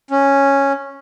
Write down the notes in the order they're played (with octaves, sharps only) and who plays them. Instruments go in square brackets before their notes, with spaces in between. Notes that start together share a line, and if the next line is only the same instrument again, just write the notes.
[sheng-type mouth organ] C#4